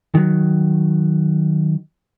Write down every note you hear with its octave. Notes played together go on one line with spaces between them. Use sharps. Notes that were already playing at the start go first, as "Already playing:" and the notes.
D#3 F#3